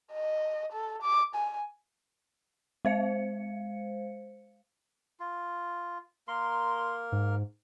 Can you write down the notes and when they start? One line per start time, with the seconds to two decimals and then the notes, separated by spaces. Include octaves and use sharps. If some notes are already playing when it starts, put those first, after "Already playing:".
0.12 D#5
0.73 A4
1.02 D6
1.35 G#5
2.85 G#3 C5 F5 C#7
5.20 F4
6.28 A#3 A#4 C6
7.12 G#2